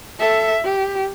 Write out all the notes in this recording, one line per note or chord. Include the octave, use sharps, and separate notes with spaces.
A4 E5
G4